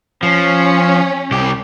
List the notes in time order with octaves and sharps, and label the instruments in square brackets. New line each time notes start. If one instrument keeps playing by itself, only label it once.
[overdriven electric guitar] F3 [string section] C#4
[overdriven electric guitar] C2 G4